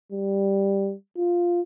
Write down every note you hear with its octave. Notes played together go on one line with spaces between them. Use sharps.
G3
F4